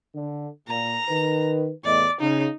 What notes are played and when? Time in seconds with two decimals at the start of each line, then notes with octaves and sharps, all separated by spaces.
0.15 D3
0.68 A#2 A#5
1.09 D#3 B4
1.85 E2 A2 D5 D#5
2.21 C#3 D#4